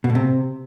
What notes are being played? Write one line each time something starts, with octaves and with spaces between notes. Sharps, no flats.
B2
A2
C3